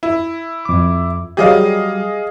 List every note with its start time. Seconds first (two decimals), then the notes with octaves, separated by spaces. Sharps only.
0.03 E4
0.65 F2 D6
1.37 F#3 G3 G4 G#4 D#5 F5